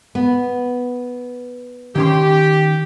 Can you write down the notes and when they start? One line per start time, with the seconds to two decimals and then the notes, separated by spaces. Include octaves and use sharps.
0.15 B3
1.96 D#3 C#4 G4 C6